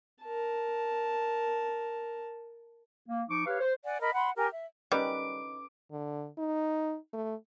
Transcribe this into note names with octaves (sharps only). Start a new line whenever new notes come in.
A#4 A5
A#3
F3 D#4 C#6 D6
G4 B4 C#5 F5
C5
D5 F#5 G#5
A#4 D#5 B5
F#5 B5 C6
G4 A#4 G#5
E5
D#3 G3 C#4 B4 D6
D3
D#4
A3